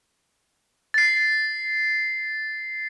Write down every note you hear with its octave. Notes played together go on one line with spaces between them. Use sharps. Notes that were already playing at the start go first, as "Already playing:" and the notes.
A6 C7